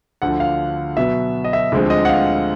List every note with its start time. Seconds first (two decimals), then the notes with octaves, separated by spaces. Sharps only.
0.22 D2 D3 F3 F#5
0.40 F5
0.97 B2 F#3 B3 E5
1.44 D#5
1.53 E5
1.72 D2 D3 F3 G#3 C4
1.90 D#5
2.05 F#5
2.09 F5